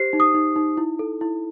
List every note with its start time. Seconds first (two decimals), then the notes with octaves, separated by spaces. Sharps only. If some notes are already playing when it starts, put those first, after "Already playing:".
Already playing: G4 C5 C7
0.13 D#4
0.20 D#6
0.34 D#4
0.56 D#4
0.77 E4
0.99 A4
1.21 E4